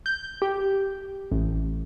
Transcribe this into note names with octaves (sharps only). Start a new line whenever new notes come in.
G6
G4
A1